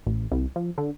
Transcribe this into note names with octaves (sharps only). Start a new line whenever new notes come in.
A1
C2
F3
D3